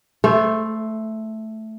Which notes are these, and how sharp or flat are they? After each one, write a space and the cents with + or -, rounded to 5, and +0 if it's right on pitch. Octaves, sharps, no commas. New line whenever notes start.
A3 +0 A4 -35 C5 +0